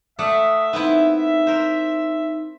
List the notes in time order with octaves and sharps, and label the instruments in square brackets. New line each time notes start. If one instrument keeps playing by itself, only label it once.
[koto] A3 D5 F#5 [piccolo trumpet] E5 [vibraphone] D#6
[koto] B3 C4 E4 [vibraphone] D#4
[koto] A#4 C5